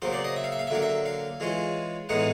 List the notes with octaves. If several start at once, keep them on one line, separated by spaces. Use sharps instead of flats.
C#3 F#3 A#3 C5
D5
D#5
E5
F5
E5
F5
E5
D3 F#3 A#3 F5
E5
F5
E3 G#3 C#4 F4
A2 E3 G#3 B3 D#4 F#5